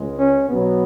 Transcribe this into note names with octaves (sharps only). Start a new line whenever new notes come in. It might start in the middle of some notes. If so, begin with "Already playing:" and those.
Already playing: C#2 C#3 G#3
C#4
B1 B2 F#3 B3